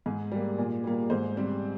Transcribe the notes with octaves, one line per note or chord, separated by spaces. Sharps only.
G#2 G#4
G3 A#3
A#2
G3 A#3
G#2 C5
G3 C4